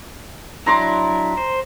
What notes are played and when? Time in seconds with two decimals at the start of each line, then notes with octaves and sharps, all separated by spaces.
0.66 F#3 D4 E4 A#5 C6 D6
1.37 C5